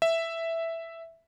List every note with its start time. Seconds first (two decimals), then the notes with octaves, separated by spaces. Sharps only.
0.02 E5